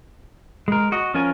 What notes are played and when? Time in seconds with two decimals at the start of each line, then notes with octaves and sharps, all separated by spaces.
0.68 G#3 A#4
0.92 F#4 D#5
1.14 F3 C#4 F4 A#4 G#5